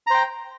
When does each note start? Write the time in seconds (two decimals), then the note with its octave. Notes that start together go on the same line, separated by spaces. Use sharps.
0.07 A#5
0.10 C5
0.14 G5